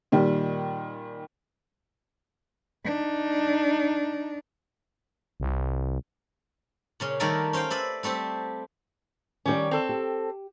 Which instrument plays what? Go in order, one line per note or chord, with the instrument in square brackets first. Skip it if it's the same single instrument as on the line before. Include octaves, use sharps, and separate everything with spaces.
[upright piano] A#2 D#3 G3
[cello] D4 D#4
[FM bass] C2
[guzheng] A#2 C#3 C#4
D#3 G3 A3 A#4 D5 G#5
C#4 C5 F5 G5
B4 D5 E5
G3 A3 C4 G4
[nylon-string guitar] D#3 D5 [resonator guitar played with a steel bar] G3 C#4
[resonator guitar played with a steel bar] C4 A4
[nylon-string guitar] G4